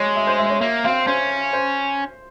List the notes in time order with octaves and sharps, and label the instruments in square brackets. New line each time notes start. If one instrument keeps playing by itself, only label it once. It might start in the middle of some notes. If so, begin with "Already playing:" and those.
Already playing: [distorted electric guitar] G#3 [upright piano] C#5
[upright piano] E5
C5
E5
C#5
[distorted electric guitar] A#3 [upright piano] E5
[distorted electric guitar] C4 [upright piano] F5
[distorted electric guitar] C#4 [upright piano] C5
[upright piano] C5